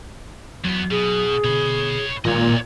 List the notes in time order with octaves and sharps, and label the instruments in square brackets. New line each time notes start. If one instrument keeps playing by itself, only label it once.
[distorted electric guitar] E2 B3 [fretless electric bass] F#3
[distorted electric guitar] B2 [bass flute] G#4
[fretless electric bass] B2 D3 [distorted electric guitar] C#5 B5
[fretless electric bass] A1 D#3 G#3 [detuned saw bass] A#2 [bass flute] F4 [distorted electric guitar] C#5 D#5